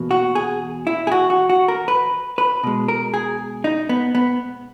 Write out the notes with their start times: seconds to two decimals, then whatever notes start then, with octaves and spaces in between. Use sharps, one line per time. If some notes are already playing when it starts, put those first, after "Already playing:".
Already playing: E2 B2 A#3
0.11 F#4
0.35 G#4
0.87 E4
1.07 G#4
1.12 F#4
1.30 F#4
1.49 F#4
1.68 A#4
1.88 B4
2.38 B4
2.63 B2 G#3
2.88 A#4
3.14 G#4
3.64 D#4
3.89 B3
4.15 B3